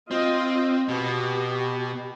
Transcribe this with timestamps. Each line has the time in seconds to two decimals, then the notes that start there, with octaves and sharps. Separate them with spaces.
0.11 C4 F4 D#5
0.88 B2 B3 G4